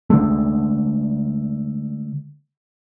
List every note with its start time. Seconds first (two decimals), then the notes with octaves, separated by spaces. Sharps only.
0.10 D3 F3 G#3 A3